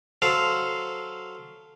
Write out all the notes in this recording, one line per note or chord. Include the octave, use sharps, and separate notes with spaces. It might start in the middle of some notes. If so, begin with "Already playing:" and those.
F#3 A4 C5 F5